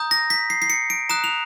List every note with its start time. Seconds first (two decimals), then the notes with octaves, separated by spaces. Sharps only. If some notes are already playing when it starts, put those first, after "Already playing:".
Already playing: A#5 D#6 G6
0.11 A#6
0.30 B6
0.50 C7
0.62 C7
0.70 C#7
0.90 D7
1.09 A#5 D#6 F#6 E7
1.24 F7